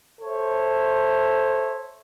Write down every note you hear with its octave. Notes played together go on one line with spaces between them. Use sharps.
A4 C5 C#5 E5